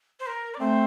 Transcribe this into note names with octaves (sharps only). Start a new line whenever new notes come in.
C5
A#4
D5
A3 C4 C5